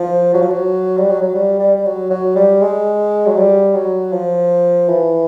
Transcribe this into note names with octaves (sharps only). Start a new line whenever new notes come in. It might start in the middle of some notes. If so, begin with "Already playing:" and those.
Already playing: F3
F#3
F3
F#3
G3
F#3
F#3
G3
G3
G3
F#3
F#3
G3
G#3
F#3
G3
F#3
F3
E3